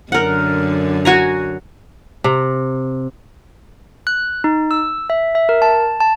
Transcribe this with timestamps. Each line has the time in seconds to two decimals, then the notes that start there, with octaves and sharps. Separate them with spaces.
0.12 F#2 D3 A#4 F#5
1.05 F#4 G#5 A#5
2.24 C3
4.07 F#6
4.44 D#4
4.71 E6
5.10 E5
5.35 E5
5.49 A#4
5.62 A5
6.00 A5